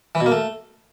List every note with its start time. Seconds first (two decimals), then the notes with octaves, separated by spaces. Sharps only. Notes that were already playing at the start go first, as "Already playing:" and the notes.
0.15 E3
0.21 B2
0.26 A#3
0.32 A3